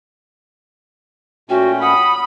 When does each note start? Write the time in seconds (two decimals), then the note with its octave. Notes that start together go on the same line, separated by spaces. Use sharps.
1.49 A#2 A3 C#4 F#4 G5
1.81 F#5 B5 D#6